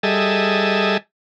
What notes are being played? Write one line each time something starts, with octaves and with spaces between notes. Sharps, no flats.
G3 G#4 A4 D#5 E5